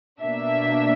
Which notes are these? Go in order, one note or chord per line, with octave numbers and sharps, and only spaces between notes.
B2 A#3 D4 E5